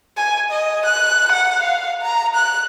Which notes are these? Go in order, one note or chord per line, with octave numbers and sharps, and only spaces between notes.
G#5
D#5
F#6
F#5
F5
A#5
F#6